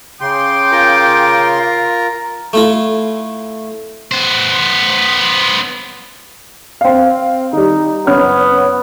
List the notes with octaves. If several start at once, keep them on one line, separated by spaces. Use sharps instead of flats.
C#3 G5 C6 D6
F4 A#4 A#5
A3 E4 F4
B3 C5
C4 F5
D#3 G3 D#4
F#1 B3 C#4 F6